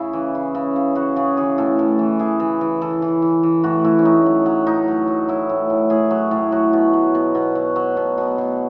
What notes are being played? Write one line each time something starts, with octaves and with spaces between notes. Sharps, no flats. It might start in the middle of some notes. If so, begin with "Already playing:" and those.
Already playing: C#3 E4
E3
C#3
C#3
C#3
C#3 F#4
C#3 G#4
E3 G#4
A2 A4
A2
E3
E3 G#4
E3
E3
E3 A4
E3
E3
E3
A2 F#4
A2 E4
C#4
A2 D#4
F#3
F#3
A2 D#4
F#3
F#3
F#3 E4
A2
A2
A2 G#4
F#3
A2
F#3 F#4
B2
F#3
B2
B2
F#3
F#3
B2
B2
B2